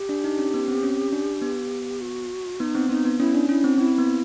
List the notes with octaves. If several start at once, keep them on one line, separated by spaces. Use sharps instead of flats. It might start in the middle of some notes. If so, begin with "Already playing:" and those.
Already playing: G4
D4
D#4
C#4
B3
C4
C#4
D4
B3
F#4
B3 D#4
C4
B3 D#4
B3
C#4 E4
D4
C#4 E4
C4
C4 E4
B3